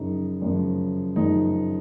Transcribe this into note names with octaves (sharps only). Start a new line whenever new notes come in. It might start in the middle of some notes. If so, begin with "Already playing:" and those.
Already playing: F#2 C#3 F3 D#4
F#2 C#3 F3
F#2 C#3 F3 D#4